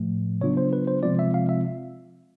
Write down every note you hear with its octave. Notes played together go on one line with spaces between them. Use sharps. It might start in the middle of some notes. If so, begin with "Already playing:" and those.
Already playing: A2 F3 A3
C#3 F#3 B3 D4 F4 C#5
C5
B4
C5
C3 F3 G#3 C4 F4 D5
E5
F5
E5